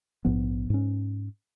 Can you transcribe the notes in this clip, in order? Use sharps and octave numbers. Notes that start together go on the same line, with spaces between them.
A#1 G#2 F3 B3
G#2 C#4